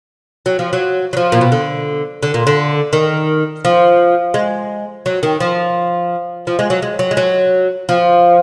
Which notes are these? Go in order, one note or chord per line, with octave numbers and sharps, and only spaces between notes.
F#3
F3
F#3
F#3
F3
A#2
B2
D3
D3
A#2
D3
D#3
F3
G#3
F#3
D#3
F3
F3
G#3
F#3
G#3
F#3
G#3
F#3
F3